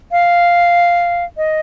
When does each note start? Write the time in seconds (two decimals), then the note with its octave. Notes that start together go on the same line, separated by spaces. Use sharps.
0.12 F5
1.37 D#5